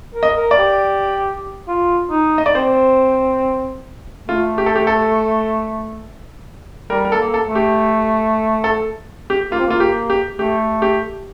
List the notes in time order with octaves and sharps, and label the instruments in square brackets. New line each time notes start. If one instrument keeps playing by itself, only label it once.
[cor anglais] A#4
[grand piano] D#5
[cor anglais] A#4
[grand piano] D5
[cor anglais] G4
F4
D#4
[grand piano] D#5
D5
[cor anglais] C4 [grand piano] C5
[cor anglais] A3 [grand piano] F4
[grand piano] G4
A4
G4
A4
[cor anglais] G3 [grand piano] A#4
[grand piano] A#4
A4
[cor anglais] A#3
[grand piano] A4
[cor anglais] A3
[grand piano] G4
A4
G4
[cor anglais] A#3 [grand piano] F4
[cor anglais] C4
[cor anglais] A#3 [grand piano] F4
[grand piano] G4
G4
[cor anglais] A3 [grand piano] G4
[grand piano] G4